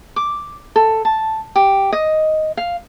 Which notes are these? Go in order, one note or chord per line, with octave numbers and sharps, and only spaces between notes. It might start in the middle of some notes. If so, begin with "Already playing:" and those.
D6
A4
A5
G4
D#5
F5